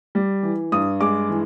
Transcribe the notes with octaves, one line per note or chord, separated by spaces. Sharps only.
G3
E3
G2 D#6
G#3 D6
E3